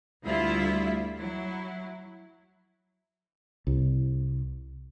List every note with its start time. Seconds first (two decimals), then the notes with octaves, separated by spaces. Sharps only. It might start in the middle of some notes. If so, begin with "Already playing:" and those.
0.23 D2 G3 E4 F4 E5
1.16 F#3 E4
3.67 C2